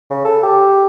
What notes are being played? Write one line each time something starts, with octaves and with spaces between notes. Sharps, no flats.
C#3
A4
G4